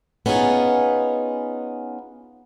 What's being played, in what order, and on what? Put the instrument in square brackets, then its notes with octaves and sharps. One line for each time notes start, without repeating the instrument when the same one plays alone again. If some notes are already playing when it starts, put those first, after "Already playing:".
[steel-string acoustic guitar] B3 C#4 D#4 F4 G#4